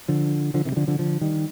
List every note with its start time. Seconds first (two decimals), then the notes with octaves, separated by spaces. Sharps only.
0.08 D3 F3
0.54 D3 F3
0.65 C3 D#3
0.72 G3
0.76 D3 F3
0.87 D3 F3
0.99 D3 F3
1.21 D#3 G3